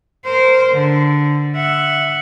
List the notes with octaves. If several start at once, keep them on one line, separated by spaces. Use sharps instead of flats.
A#4 C5
D3
E5 F#5